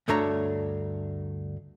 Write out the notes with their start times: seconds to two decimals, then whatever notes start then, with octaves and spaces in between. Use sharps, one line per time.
0.08 D2 G2 A3 D4 C#5 A#5